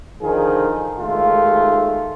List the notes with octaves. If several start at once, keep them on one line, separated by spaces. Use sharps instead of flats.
D3 D#3 F3 G#4
D#2 G#3 A3 F4